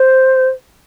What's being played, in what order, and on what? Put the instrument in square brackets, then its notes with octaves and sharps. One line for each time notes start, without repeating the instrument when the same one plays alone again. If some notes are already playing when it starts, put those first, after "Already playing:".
Already playing: [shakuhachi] C5